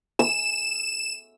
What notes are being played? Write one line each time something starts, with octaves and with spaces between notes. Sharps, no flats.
E6 E7